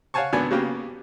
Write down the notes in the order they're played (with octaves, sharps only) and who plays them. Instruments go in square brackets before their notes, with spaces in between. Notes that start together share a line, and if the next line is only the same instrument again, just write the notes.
[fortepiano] C#5 F5 F#5 G#5 A5 C#6
G#1 F#3 B3 D4 G#5 B5
C#3 F#3 A#3 B3 G4